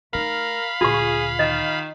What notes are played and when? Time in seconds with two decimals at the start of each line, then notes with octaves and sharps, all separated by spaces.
0.13 A3 D#4 A#4 F5 B5
0.81 D2 A#2 F4 G#4 C#6
1.39 D#3 D#5